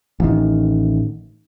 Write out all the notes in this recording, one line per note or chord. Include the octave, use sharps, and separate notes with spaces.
A1 D#3